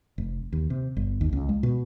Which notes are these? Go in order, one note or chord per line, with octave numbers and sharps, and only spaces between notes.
F1
D#2
C3
G1
D#2
C#2
G#3
B2